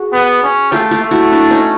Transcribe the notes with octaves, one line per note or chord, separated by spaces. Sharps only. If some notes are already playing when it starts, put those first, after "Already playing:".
Already playing: F#4 G#4
B3
C#4
A3 F4 G4
F4 G4
A3
E4 F#4
D4 E4
C#4 D#4